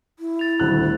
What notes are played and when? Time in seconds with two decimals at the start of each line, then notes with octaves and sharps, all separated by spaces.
0.19 E4
0.39 A6 F7
0.60 D#1 D2 F#6